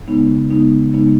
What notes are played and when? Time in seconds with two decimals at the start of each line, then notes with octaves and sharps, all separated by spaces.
0.08 C#3 G#3 B3 D#4
0.51 C#3 G#3 B3 D#4
0.93 C#3 G#3 B3 D#4